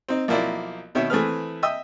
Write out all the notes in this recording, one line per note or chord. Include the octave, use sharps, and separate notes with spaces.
C4 D#4
B1 F3 A#3 E4 D5
B2 D#3 C#5 E5
E3 A3 C4 G#4 B4 F6
D#5 E5 G5 D#6 E6